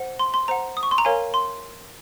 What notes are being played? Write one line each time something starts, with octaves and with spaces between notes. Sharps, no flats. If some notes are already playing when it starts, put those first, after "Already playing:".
Already playing: C5 F#5
C6
C6
C5 F#5 A#5
D#6
C#6
C6
A#5
A#4 C#5 F5 G#5
C6